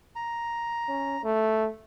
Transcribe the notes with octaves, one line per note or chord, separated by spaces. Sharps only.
A#5
C#4
A3